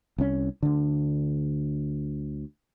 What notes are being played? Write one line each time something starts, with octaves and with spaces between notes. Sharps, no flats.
C2 C#4
D2 D3